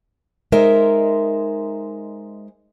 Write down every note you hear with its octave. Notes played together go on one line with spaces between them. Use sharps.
G#3 D#4 A#4 C5 E5